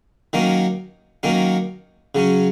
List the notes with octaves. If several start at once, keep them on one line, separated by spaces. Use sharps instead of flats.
D#3 F#3 A#3 C#4
D#3 F#3 A#3 C#4
C#3 F#3 C#4